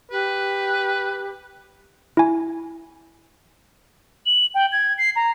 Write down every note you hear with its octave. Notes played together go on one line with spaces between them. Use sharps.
G4 B4
E4 G#5
F#7
G5
G#6
C7
A#5